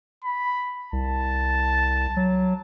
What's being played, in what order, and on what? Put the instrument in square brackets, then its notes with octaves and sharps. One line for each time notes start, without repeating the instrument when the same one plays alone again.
[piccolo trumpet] B5
[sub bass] C2 [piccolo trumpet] A5
[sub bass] F#3